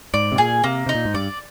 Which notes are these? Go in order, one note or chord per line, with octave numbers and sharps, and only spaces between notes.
G#2 D5
C3
A#2 G#4
C3 A#3
C3 D#4
A#2
G#2
G2 D5